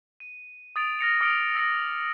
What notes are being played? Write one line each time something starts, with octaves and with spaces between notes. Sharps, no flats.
D#7
D#6 A6 D7 F7
F6 A#6 C#7 F7
D6 D#6 F6 C#7 D7
E6 A#6 C#7